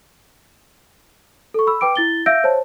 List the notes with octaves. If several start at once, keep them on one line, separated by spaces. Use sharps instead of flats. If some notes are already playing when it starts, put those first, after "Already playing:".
A4 C#6
B5 E6
B4 G5 D6 D7
E4 A6 G7
E5 F5 E6 G6 A#6 D7
C5 C#5 A5